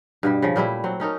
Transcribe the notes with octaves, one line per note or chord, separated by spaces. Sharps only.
G2 B2 G3
C#3 F3
A#2 G3 A3 E4
F#3 C4
C#4 D#4 A4 A#4